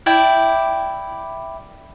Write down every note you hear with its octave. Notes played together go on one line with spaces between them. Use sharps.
E4 D5 G5